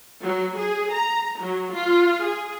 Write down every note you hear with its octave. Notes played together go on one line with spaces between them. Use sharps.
F#3
G#4
A#5
F#3
F4
G#4